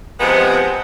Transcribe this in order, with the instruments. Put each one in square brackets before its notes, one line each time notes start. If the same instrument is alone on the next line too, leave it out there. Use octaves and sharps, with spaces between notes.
[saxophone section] C3 F3 G#3 B3 C4